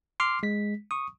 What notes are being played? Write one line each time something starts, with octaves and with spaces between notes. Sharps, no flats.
C6 D6 F6 C7
G#3 B6
C#6 D#6